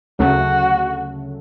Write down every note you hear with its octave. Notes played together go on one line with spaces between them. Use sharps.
D2 C#3 F#3 A3 F#4